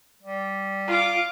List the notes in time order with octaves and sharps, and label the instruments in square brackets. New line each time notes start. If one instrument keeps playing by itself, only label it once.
[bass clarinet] G3
[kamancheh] F4 D6